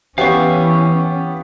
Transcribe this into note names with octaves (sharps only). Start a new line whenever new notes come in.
E3 B3 C#4 G4 F5 C#6